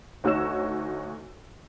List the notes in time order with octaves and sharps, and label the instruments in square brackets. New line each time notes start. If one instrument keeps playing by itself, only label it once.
[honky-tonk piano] D2 D#4 F#4 C#5 E6 E7